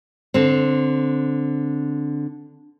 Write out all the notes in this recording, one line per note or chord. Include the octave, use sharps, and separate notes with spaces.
D3 C4